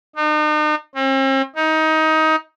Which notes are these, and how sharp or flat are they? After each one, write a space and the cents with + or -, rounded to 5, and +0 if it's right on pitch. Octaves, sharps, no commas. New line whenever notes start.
D#4 -40
C4 +45
D#4 +20